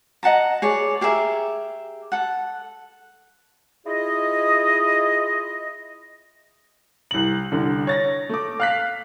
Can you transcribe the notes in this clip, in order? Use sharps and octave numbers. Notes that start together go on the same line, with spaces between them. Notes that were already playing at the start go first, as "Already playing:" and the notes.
D#5 F#5 A5 A#5
G#4 C#5 D5
G4 G#4 A#4 E5
A4 F#5
E4 F4 G#4 D#5
C2 F#7
C2 D3
C#5 A6 A#6
A3 D6
F5 F#6 B6